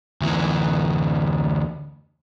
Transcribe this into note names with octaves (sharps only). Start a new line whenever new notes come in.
D2 E3